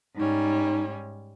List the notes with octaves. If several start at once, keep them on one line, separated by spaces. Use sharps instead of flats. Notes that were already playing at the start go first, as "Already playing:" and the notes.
G#2 G3 C#4 D#4